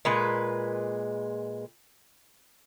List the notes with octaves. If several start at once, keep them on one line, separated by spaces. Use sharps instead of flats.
A#2 G#3 B4